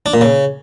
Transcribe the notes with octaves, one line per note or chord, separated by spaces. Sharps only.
D4
A#2
C#3